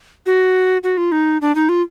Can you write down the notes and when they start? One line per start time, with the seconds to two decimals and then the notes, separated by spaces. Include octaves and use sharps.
0.26 F#4
0.83 F#4
0.97 F4
1.12 D#4
1.41 D4
1.55 D#4
1.69 F4